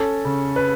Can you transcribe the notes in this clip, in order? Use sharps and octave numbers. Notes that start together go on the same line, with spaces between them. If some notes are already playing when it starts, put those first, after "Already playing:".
Already playing: C#4 A4
C#3
B4